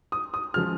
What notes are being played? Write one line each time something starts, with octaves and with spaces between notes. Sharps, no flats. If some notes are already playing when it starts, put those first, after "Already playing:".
D#6
D#6
C#3 F3 G#3 F6